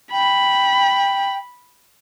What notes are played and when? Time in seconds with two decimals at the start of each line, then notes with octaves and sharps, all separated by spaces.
0.12 G5 B5